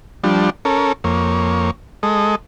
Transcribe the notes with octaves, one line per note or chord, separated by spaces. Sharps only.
F3 G3 D4
C#4 A4 A#4
F2 A#3 C#5
G#3 A4 D#5